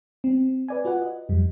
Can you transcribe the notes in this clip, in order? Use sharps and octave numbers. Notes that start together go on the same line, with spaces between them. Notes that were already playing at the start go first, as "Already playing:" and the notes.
C4
B4 D5 G#5
F4 F#4 B4 F#5
D#5
F2 G3